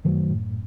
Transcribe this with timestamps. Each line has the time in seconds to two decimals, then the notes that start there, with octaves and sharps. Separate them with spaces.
0.05 F#2 D#3 F#3 A3
0.31 A2